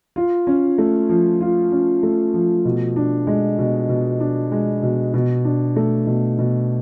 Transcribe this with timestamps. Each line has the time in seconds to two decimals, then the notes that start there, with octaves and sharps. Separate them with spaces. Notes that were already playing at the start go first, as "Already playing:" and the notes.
0.16 F4
0.47 C#4
0.78 A3
1.09 F3
1.41 F4
1.72 C#4
2.03 A3
2.34 F3
2.65 B2
2.96 D4
3.27 G#3
3.59 B2
3.89 B2
4.20 D4
4.52 G#3
4.83 B2
5.14 B2
5.45 D4
5.76 A3
6.07 B2
6.39 B2